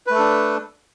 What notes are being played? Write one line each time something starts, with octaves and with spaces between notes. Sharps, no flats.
A3 D4 A4 B4